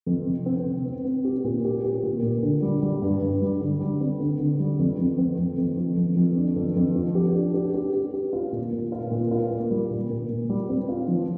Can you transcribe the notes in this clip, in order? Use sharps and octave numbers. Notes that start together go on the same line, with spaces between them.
F2
C3
C4
C3
C4
C4
G4
A#2
G4
G4
A#2
A#2
D3
G3
G3
G2
G2
G3
D3
G3
C4
D3
D3
G3
F2
F2
C4
F2
F2
F3
F2
F2
D4
F2
F2
F3
G4
D4
G4
G4
G4
G4
F4
A#2
A#2
F4
A#2
F4
A#3
G3
A#2
A#2
A#2
G3
C4
F4
F3